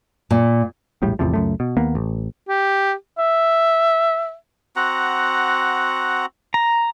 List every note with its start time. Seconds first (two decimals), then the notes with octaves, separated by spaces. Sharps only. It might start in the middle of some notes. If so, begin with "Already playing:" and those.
0.31 A#2
1.02 E1 A#1 A2 G3
1.19 A1 E2 C3 F3
1.33 C#2 F#2 A3
1.60 B2
1.77 D#2 A#3 B3
1.95 A1
2.49 G4
3.18 E5
4.76 C4 F#4 F#5 A#5
6.54 A#5